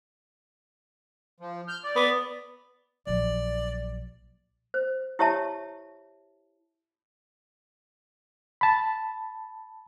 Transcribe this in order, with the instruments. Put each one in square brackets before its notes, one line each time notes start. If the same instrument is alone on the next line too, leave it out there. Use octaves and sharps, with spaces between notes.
[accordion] F3
F6 G6
D5
[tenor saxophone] B3
[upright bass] A#1 F#3 [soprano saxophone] D5
[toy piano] C5
E4 G4 C#5 E5 A5
[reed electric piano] A5 B5